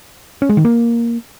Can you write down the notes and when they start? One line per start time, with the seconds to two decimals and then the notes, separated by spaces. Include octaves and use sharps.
0.42 C#4
0.49 G#3
0.57 D#3
0.65 A#3